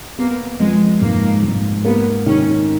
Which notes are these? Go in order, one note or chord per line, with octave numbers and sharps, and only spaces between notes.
A#3 B3
F3 G#3
G#2 A#3
G#2
A#3 B3
D#3 C#4